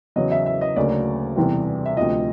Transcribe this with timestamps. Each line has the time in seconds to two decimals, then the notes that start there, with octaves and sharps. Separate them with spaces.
0.16 E2 C#3 F#3 D#5
0.32 E5
0.46 E5
0.61 D#5
0.76 D2 C#3 F#3 A#3 D5
1.36 E2 C3 E3 G3
1.86 E5
1.97 D2 C3 F3 D#5